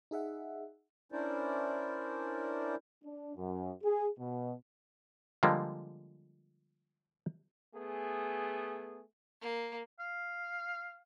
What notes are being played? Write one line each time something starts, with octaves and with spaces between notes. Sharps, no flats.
D#4 G#4 E5 F#5
C#4 D4 E4 A#4 C5 D5
D4
F#2
G#4
B2
D3 F3 G3 G#3 A#3
A3 B3 G#4
A#3
F5